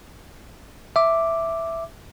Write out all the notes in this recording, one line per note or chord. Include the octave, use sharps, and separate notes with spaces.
E5 D6